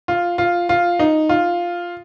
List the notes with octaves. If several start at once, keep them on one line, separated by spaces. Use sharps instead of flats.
F4
F4
F4
D#4
F4